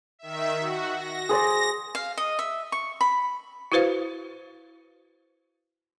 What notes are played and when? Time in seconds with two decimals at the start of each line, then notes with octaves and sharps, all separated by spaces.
0.19 D#3 E5
0.60 F#4
0.95 A#6
1.29 G#4 C5 D5
1.95 F5
2.18 D#5
2.39 E5
2.72 C#6
3.01 B5
3.72 E4 F#4 B4 C5 F5